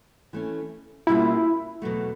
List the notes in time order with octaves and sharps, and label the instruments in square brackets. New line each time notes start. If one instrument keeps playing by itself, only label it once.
[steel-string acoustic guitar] E3 A3 C#4
[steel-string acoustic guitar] B2 G3 A#3 C#4 F4 [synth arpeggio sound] E4
[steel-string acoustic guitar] E2 B2 F#3 A3